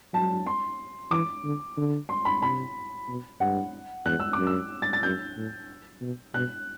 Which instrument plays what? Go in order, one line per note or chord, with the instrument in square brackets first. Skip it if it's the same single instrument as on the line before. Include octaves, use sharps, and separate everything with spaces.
[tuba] F#3 [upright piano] A5
[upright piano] C6
[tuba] E3 [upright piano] D6
[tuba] D3
D3
[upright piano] C6
B5
[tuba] C3 [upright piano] B5
[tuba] B2
[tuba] G2 [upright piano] F#5
[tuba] E2 [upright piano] F#6
[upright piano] E6
[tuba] F#2 [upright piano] D6
[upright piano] E6
A6
A6
[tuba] F#2 [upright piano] G6
[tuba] A2
B2
[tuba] B2 [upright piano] F#6